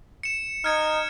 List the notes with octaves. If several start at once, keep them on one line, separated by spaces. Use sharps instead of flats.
C#7 E7
D#4 F6 G#6 C#7